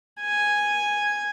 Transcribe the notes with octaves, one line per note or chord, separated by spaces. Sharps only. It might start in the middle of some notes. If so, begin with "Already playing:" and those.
G#5